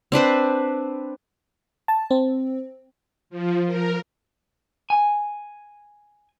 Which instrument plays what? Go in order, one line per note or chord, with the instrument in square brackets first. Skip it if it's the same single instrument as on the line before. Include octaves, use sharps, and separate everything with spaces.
[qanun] C4 D4 B4 C5
[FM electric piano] A5
C4
[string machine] F3
A#4
[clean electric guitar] G#5